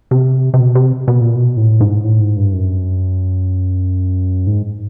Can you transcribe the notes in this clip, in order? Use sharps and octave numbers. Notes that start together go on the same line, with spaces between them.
C3
C3
B2
C3
B2
A#2
B2
A2
G#2
A2
G#2
G2
F#2
G#2